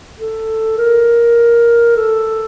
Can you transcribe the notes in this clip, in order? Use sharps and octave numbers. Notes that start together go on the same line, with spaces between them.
A4
A#4
A4